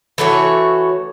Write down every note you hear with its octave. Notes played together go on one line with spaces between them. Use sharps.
E3 A3 F#4 C#5